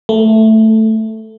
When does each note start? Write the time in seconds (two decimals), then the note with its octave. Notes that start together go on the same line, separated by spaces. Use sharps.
0.09 A3